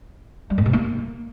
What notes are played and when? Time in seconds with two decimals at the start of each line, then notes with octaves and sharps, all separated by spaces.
0.50 G3
0.58 G#2
0.66 C3
0.73 A#3